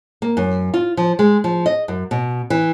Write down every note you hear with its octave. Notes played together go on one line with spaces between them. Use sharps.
A#3
F#2
F4
F3
G#3
F3
D#5
F#2
B2
E3